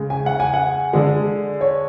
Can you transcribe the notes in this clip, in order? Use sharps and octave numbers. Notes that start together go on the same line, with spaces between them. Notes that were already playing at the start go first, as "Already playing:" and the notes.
Already playing: C#3 G#3
G#5
F#5
G#5
F#5
D3 G#3
C#5